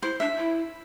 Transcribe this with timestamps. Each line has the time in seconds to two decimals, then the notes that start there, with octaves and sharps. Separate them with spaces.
0.03 E4 C5
0.20 D4 E5
0.38 E4